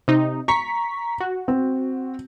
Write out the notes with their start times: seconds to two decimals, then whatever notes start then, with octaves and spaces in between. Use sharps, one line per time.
0.08 C3 D#4
0.48 A#5 C#6 B6
1.20 F#4
1.48 C4